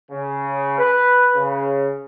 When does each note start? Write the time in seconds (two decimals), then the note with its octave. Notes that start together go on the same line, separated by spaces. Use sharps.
0.10 C#3
0.78 B4
1.36 C#3